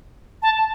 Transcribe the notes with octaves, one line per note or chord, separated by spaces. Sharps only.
A5